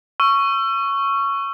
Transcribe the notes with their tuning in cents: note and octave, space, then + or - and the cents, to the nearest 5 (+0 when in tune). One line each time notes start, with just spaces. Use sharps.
C#6 +0 E6 +40